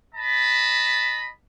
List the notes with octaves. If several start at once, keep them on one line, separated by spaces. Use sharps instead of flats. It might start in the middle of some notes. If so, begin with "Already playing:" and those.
D#5 A5 B5